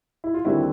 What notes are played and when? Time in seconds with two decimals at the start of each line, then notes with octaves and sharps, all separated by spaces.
0.24 E4
0.34 F4
0.45 D#2 D3 G3 C4 E4 F#4